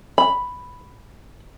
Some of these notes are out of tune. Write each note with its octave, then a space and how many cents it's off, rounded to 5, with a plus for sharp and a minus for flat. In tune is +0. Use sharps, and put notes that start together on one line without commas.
B5 +0